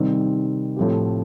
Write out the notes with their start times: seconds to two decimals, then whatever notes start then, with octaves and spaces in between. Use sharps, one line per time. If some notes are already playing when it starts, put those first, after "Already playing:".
Already playing: C3 D#3 G3 C4
0.76 A2 F3 A3 C4 G4